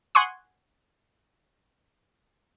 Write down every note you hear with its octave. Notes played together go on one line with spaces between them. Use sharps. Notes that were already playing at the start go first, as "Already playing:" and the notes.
F#5 G#5 C6 C#6 D#6